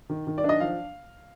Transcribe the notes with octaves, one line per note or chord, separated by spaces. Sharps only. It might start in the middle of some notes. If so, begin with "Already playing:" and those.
D#3
D#3
D5
D4 D#5
F3 F5